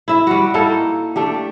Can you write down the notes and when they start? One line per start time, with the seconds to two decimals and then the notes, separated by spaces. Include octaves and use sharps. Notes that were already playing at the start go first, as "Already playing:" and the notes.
0.08 E4 E5
0.27 G3 F#4
0.54 A#3 D#4 E4 A4
1.16 A3 D4 G4